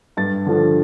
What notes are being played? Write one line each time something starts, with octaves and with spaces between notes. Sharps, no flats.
G2 A6
D3 F3